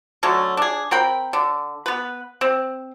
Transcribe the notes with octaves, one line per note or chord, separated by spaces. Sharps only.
D3 F#3 A3 C#4
D4 G#4
C4 A#4 G5 B5
D3
B3 B4
C4